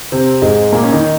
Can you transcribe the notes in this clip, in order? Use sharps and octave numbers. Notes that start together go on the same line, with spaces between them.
C3 C4
G#2 G#3
A#2 A#3
C#4
D#3 D#4